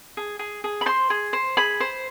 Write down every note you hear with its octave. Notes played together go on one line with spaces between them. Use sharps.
G#4
G#4
G#4
B5
C5 C6
G#4
C5
G#4 B5
C5